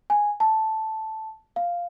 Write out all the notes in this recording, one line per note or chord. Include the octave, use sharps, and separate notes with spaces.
G#5
A5
F5